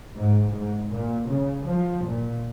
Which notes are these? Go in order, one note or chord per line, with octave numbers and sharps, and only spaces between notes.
G#2
G#2
A#2
C#3
F3
A#2